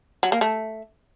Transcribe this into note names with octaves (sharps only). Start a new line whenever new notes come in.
F#3
A#3
A3